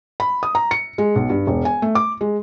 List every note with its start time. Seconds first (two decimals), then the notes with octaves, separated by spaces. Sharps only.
0.20 B5
0.43 D#6
0.55 A#5
0.71 C#7
0.98 G#3
1.15 B1
1.30 G2
1.47 E1
1.65 G#5
1.82 A3
1.95 D6
2.21 G#3